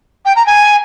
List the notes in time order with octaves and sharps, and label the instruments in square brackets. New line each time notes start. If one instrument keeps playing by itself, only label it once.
[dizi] G5
A#5
G#5